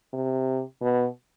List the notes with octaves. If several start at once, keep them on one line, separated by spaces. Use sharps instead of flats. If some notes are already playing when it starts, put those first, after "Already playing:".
C3
B2